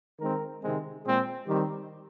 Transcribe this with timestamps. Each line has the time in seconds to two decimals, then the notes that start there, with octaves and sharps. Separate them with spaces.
0.20 D#3 G#3 C4 A#4
0.62 C3 D#3 G#3 C4
1.04 A#2 G#3 C4 G#4
1.48 D#3 G3 C4 G4